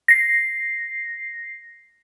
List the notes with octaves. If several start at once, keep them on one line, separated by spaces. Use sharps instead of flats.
A#6 C7